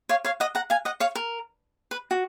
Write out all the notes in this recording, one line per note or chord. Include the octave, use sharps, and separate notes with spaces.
C#5 F5
C#5 F5
D#5 F#5
F#5 A#5
F5 G#5
D#5 F#5
C#5 F5
A#4
B4
F#4